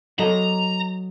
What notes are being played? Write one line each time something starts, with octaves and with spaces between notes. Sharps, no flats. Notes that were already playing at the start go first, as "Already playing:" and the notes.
F#3 A4 D#5 A#5